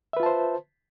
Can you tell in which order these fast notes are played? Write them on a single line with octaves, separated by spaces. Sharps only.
E5 B4 F4 A5 C5